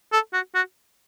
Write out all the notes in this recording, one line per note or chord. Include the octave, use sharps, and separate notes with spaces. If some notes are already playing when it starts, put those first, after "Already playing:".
A4
F#4
F#4